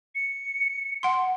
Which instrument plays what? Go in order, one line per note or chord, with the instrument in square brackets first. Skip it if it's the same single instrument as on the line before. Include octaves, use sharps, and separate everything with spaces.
[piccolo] C#7
[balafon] F#5 C6